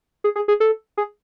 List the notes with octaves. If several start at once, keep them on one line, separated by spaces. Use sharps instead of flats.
G#4
G#4
G#4
A4
G#4